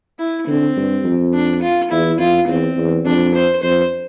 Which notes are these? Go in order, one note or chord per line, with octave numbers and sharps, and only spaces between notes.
E4
D3 C4
G2
F2
D4
F4
E2 E4
F2 F4
E2 C4
E2
F2 D4
C5
F2 C5